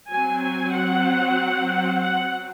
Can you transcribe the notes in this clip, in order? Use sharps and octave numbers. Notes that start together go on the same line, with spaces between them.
F#3 C4 G#5
G#5
F#5
F#5